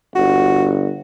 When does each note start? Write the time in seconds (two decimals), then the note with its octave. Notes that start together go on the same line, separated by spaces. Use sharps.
0.15 G1 F#4